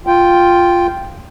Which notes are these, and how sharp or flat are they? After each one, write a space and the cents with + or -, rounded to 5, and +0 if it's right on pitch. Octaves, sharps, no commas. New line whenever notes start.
F4 +0 G5 +0